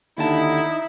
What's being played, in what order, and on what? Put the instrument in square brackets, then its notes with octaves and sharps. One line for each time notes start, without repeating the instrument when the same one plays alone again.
[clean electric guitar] D#2 D3 A5 [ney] D#4 [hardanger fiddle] E4